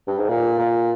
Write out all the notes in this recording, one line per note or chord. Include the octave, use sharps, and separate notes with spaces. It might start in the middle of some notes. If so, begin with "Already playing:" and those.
G2
G#2
A#2
A#2